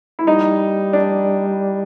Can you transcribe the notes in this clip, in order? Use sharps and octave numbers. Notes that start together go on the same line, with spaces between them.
E4
G3 D#4
D4